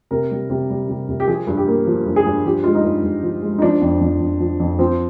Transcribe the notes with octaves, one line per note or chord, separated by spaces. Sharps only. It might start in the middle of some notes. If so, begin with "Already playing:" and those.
C3 A#4
G3
C3
G3
C3
C3
G4
F3 G#4
G2
G4
A#3
F3
G2
G#4
G2
F3 G4
G#3 F4
D#4
G2
G2
F3
G#3
D#4
F3 D4
F2
F2
F2
F3
F2
F3 C4